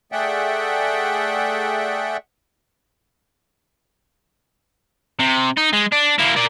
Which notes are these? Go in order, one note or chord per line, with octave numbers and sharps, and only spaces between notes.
A3 G#4 D5 E5 F#5 G5
C3
D#4
G#3
D4
A#3 E4
A#4 D5